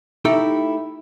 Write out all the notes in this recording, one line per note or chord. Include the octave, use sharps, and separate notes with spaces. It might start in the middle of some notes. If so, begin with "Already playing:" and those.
A3 D#4 E4 G4 A4 G5